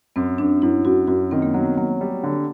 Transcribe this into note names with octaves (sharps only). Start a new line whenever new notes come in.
F#2 C4
F#2 D4
F#2 E4
F#2 F#4
F#2 F#4
D#3 C4
A#3
F#3 B3
F#3 A#3
G3
D3